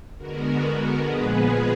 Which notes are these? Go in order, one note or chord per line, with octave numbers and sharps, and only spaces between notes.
D3 G#3 B3 F#4 A#4
F#4 A#4
A#2 F3 G#3 B3 G#4 B4